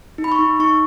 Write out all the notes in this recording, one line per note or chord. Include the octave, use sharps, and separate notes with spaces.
D#4
B5
C#6
D#4
D#4 C#6